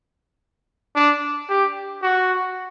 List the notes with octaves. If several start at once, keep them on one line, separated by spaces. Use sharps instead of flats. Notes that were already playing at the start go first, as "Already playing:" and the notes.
D4
G4
F#4